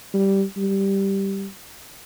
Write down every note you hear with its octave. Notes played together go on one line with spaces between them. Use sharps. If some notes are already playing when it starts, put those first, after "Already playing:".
G3
G3